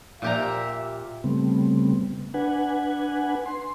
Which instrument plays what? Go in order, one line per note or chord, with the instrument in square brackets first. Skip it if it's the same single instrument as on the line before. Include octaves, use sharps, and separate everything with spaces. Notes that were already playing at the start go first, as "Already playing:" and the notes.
[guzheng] A#2 G4 A#5 [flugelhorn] E5
[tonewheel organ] C#3 G3 A3 B3 C4
D4 B4 F#5 G#5
C6